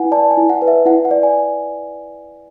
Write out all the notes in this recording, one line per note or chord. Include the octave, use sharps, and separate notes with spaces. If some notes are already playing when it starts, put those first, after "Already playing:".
Already playing: E4 B4 F#5 G#5
D5 A5
G#5
E4
F#5
B4
E5
E4 F#5
F#5
D5
G#5